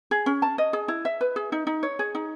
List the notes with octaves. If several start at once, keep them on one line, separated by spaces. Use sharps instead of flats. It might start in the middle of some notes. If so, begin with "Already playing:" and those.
G#4
C#4
A5
D#5
G#4
E4
E5
B4
G#4
D#4
D#4
C#5
G#4
D#4